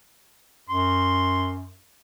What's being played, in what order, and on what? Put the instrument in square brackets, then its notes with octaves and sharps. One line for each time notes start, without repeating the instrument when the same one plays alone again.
[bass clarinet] F#2 [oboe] C6